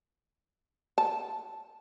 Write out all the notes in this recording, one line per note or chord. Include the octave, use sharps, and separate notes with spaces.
A5